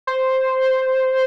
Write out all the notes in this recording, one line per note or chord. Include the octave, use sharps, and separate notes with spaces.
C5